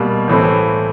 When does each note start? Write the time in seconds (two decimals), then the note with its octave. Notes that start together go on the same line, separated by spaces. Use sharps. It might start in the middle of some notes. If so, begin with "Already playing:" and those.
Already playing: B2 G3 A#3
0.28 A2 E3 A3 C4